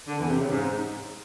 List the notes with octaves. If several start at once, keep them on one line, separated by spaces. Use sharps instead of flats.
D3
E2
C3
C#3
G#2